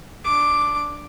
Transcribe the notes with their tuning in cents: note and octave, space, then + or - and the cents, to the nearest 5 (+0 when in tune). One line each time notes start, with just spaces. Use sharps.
D4 +0 D6 +5